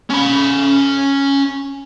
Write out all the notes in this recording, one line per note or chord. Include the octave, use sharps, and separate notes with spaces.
C#4 B5